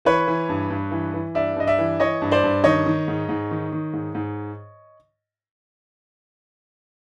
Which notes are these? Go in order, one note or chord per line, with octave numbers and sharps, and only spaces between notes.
E3 B4 C#5
E3
G2
G2
E3
E3
G2 D5 E5
G2 D#5
D5 E5
E3
E3 C#5 D#5
G2
C5 D5
G2
D#3 C#5 D#5
D#3
G#2
G#2
D#3
D#3
G#2
G#2